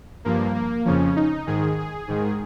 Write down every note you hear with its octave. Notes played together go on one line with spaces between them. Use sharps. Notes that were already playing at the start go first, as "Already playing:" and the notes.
G2 F3 A#3
A#3
F2 C#3 F3 C#4
D#4
G#2 D#3 G#4
G#4
G#2 D#3